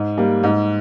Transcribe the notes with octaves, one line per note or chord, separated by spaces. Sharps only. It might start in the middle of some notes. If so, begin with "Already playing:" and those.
Already playing: G#2
G3 A#3
G#2